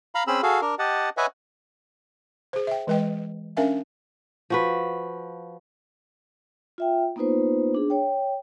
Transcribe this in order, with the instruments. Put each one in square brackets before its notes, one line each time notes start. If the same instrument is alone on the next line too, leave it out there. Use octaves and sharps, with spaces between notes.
[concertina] F5 A#5 B5
C4 C#4 G#4 B5 E6
F#4 G#4 A4 F5
D4 A#4
G4 D#5 F#5 A5
B4 C#5 D#5 E5 F#5 G#5
[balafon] G#4 C5
E5 G5
E3 G#3 B4 D#5 G5
C#4 D4 A#4 E5 F5 G#5
[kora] F3 F#4 B4
[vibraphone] F4 E5 G5
A#3 B3 D#4 F4 B4 C5
D4 G#4
C#5 G5